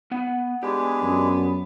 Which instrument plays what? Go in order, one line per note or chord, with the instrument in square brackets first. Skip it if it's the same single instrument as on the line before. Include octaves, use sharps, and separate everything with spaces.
[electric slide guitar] B3 F#5
[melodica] G#3 D4 G#4 [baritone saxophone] B3 [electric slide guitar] G4
[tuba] F#2